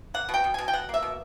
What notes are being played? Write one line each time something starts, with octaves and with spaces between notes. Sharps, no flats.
A#3 F#5
B2
G5
B2
B2 G#5
G5
B2 F#5
A#3 E5
B2